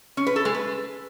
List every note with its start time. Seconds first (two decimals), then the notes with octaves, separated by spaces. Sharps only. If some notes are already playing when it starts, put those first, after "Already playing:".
0.17 C#4
0.27 B4
0.36 A4
0.45 G#3
0.54 B4